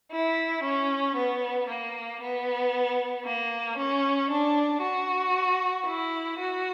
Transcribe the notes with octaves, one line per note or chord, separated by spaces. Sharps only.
E4
C#4
B3
A#3
B3
A#3
C#4
D4
F#4
E4
F#4